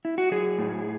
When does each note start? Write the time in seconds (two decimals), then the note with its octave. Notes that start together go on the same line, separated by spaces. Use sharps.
0.05 E4
0.18 F#4
0.31 F#3 G#4
0.59 A2